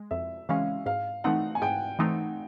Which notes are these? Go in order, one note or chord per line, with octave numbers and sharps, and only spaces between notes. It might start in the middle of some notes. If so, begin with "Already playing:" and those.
Already playing: G#3
F2 E5
C#3 E3 G#3 C#4 F5
G#2 F5
E3 A3 C4 D#4 F#5
G#5
G#2 G5
E3 A3 C4 D#4